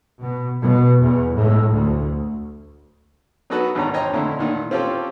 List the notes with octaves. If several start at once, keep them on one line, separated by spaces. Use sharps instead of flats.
B2
B2
E2
A2
D2
F#3 B3 D#4 F#4 A4 B4
G#1 E2 G2 D#3 C#4 A#5
C5 C#5 D#5 G5 A#5
F2 A#2 D3 A3 C#4 E4
A#2 D#3 E3
C4 C#4 F4 G4 A4